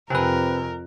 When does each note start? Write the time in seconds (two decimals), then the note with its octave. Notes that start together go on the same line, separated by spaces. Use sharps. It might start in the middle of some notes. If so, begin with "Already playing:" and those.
0.10 F2 C3 C4 A#4 B4 G#5 F#6